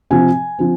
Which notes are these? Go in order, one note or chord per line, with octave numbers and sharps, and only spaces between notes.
C3 F3 C4 G#5
F3 C4